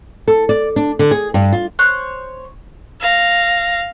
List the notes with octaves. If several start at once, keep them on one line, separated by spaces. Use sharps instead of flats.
A4
D5
D4
D3
G#4
G2
F4
C5 C#5 F#6 G6
F5 A#6